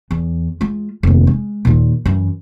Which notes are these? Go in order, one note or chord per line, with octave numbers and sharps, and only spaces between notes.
E2
G#3 F4
F1 D#2
G#3
D#2 A#2
F#2 E3